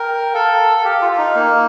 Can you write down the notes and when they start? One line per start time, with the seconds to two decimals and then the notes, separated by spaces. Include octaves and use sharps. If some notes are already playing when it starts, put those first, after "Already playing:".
Already playing: A#4 G5
0.34 A4 F5
0.77 A4
0.85 G4 F5
1.02 F4
1.12 F4
1.18 D#4
1.35 A#3